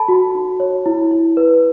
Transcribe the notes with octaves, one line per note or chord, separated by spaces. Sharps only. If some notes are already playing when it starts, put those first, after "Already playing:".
Already playing: A4 C#5 A5 B5
F#4
D#4
C#5
E4
E4
B4